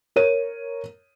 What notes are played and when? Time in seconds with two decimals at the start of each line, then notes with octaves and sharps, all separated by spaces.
0.16 A#4 C#5 D#7